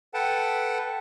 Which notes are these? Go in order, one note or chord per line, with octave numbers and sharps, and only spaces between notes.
A4 B4 F#5 G5 A5